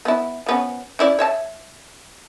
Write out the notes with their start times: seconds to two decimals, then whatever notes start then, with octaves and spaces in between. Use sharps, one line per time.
0.05 B3 E4
0.46 F3 B3 C#4
0.99 C#4 E4 D5
1.19 C#5 E5 A5